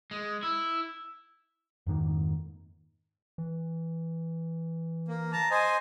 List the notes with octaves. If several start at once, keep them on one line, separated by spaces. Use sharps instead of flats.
G#3
E4
F2 G#2 D#3 A#3
E3
A#3
A5 A#5
C5 D#5 G#5